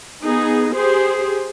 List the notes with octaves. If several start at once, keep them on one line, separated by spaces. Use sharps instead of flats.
B3 D#4 G#4
G4 G#4 C5